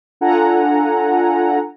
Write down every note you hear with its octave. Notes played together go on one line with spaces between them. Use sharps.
D4 F4 A4 F#5 G#5 A#5